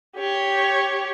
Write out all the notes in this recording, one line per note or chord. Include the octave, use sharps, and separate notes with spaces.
G4 C#5